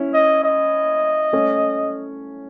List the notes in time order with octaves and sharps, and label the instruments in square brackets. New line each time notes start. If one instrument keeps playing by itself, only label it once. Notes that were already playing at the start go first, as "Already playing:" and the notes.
Already playing: [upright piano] C#4 E4
[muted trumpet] D#5
D#5
[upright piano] A3 C#4